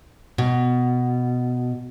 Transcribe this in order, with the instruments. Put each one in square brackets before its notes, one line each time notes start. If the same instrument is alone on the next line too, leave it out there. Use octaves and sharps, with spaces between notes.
[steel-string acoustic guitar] B2